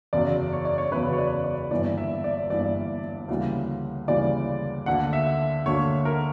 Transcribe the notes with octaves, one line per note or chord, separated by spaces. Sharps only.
F#1 E2 C#3 F#3 D5
C#5
D5
C#5
F#1 E2 C#3 F#3 B4
C#5
D5
D5
G1 G2 E3 A#3 D5
E5
D5
G1 G2 E3 A#3 D5
D2 C#3 E3 G3 A#3
D2 C#3 E3 G3 A#3 D5
D2 D3 A#3 F#5
E5
D2 D3 A#3 C#5
A#4